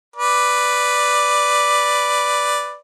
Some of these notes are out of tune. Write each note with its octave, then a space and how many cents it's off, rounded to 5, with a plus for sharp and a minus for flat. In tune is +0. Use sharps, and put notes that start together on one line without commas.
B4 +0 D5 +0